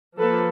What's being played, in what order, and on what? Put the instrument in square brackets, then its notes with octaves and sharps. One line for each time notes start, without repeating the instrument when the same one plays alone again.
[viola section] F3 A#3 A4 B4